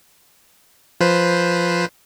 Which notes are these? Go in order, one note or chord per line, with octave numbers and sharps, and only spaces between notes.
F3 B4 C5